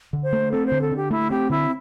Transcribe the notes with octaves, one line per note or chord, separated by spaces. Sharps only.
D3
C5
A3
C4 A4
C5
D3
A4
D3
G4
A3 E4
C4 G4
D3 E4